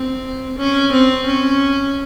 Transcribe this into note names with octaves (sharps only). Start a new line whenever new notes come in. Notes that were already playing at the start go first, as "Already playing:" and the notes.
Already playing: C4
C#4
C4
C#4